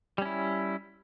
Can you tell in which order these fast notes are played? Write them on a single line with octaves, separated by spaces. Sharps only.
G3 C#4 E4